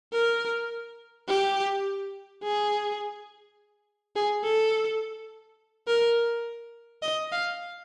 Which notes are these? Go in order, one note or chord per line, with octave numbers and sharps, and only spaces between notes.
A#4
G4
G#4
G#4
A4
A#4
D#5
F5